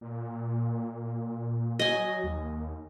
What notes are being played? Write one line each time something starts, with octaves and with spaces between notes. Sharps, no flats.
A#2
F#3 D#5 G#5
D#2